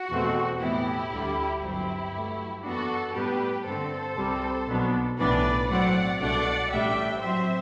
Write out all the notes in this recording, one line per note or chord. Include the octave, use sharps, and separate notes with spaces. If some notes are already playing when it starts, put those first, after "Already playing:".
Already playing: F#4
E2 B2 A3 C4
A2 E3 B3 E4 G4
D2 D3 G3
G1 G2 F#3 C4 E4 G4
G2 F#3 A3
F#2 E3 B3 D4 F#4 A4
A2 G3 B3 D4 G4 B4
G2 D3 A3 C4 A4 C5
C2 C3 G3 C4
B1 B2 F#3 B3 D4
B1 A2 E3 B3 D4 B4 D5
A2 F#3 C4 D5 F#5
C2 B2 A3 D4 D5 F#5
A1 A2 G3 D4 E5 G5
A2 F#3 C4 C5 E5